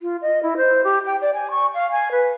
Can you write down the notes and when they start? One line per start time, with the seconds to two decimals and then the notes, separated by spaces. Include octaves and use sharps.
0.01 F4
0.22 D#5
0.43 E4
0.57 C5
0.84 G4
1.06 G5
1.22 D5
1.34 G#5
1.51 C#6
1.74 F5
1.91 G#5
2.11 B4